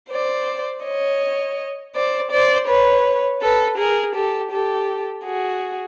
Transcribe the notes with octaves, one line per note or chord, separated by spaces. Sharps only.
C5 D5
C#5 D#5
C5 D5
C5 D5
B4 C#5
A4 B4
G#4 A#4
G4 A4
G4 A4
F#4 G#4